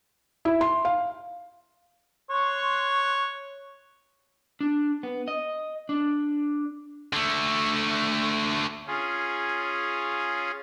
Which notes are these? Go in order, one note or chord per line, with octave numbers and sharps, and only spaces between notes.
E4
C6
F5
C#5 C6 C#6 F#6
D4
B3
D#5
D4
D3 A3
C#4 F4 G#4